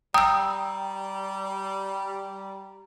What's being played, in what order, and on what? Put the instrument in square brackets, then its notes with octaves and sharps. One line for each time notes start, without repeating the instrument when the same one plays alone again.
[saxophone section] G3 [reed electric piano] G5 [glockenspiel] A#5 [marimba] D#6 E6